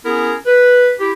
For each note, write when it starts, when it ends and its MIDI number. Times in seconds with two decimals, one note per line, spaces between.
0.05 0.34 59
0.05 0.34 61
0.05 0.34 64
0.05 0.34 68
0.05 0.34 70
0.46 0.92 71
0.99 1.12 64
0.99 1.12 67